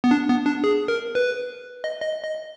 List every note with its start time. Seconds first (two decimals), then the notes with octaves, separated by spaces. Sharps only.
0.04 B3
0.11 D4
0.29 B3
0.46 D4
0.64 G#4
0.88 A#4
1.15 B4
1.84 D#5
2.01 D#5
2.23 D#5